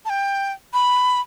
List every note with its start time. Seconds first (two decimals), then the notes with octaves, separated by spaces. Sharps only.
0.05 A5
0.10 G5
0.73 B5